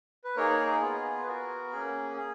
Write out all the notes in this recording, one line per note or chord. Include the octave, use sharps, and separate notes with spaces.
B4
A#3 D#4 G#4 A#4 C#5
B3 F4 G#4
B4
B3 F#4 A#4
A#3 C#4 G#4
G#4